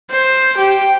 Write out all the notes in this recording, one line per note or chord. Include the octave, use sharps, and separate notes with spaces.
C5
G4